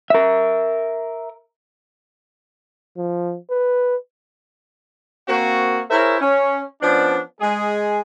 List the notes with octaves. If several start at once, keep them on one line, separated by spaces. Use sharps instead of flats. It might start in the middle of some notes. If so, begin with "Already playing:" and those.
A#4 E5
F3
B4
A#3 C4 F#4
E4 G#4 A#4 C5 C#5 E5
C#4
F3 B3 C#4 D4
G#3 G#4